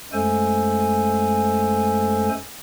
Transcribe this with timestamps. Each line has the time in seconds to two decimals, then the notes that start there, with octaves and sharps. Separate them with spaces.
0.12 F#2 G#3 A3 A4 C5 G#5